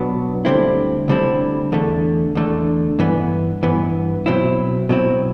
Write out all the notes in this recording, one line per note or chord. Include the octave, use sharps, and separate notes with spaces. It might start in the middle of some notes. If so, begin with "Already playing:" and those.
Already playing: B2 F#3 B3 D4
D2 D3 G3 C4 E4
D2 D3 G3 C4 E4
E2 D3 A3
E2 D3 A3
G2 E3 B3
G2 E3 B3
B2 F#3 C4 E4
B2 F#3 C4 E4